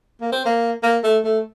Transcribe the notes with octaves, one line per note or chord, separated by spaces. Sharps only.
A#3
C4
A#3
A#3
A3
A3